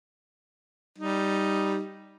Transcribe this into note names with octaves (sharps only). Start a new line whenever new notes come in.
G3 D#4